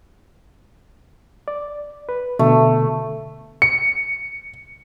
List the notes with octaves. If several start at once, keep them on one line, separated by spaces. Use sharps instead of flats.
D5
B4
B2 D3 A3
C#7